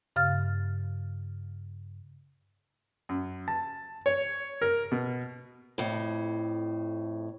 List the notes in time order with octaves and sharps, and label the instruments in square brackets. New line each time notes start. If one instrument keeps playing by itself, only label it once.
[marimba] G2 C#3 F5 F6 A6
[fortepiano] F#2
A5
C#5
A#4
B2
[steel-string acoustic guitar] F2 A2